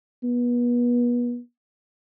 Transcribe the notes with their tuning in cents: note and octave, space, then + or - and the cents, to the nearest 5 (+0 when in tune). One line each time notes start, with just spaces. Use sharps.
B3 -35